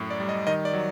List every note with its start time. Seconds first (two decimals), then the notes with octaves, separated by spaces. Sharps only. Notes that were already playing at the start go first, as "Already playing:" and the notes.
Already playing: F#2 A2
0.10 D5
0.20 G3
0.29 D#5
0.47 D#3 D#5
0.65 D5
0.73 F#3